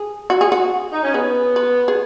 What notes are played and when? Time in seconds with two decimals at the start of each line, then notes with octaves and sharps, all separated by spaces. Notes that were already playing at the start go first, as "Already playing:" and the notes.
Already playing: G#4
0.30 F#4
0.41 G#4
0.52 F#4
0.91 D#4
1.02 C#4
1.14 B3 G#4
1.56 B4
1.88 G#4